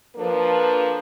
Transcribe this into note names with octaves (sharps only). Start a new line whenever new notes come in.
F3 A#3 D4 A4 B4